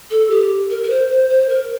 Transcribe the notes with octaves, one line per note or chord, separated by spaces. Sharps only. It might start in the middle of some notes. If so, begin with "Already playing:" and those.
A4
G4
A#4
A#4
C5
C5
C5
A#4